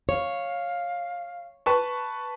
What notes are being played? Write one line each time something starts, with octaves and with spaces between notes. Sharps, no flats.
C#5 F5
B4 A5 C#6